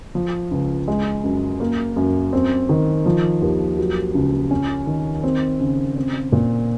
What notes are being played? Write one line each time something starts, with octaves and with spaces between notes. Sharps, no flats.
F3
C#2
G#3
F#2
A#3
F#2
C4
D#3
F3
D#2
F#3
C#2
C#4
D#3
C4
C#3
C4
A#2